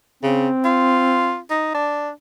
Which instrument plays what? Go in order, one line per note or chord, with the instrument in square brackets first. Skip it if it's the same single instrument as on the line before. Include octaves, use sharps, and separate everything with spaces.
[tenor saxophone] C#3 [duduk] C4
[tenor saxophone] F4
D#4
D4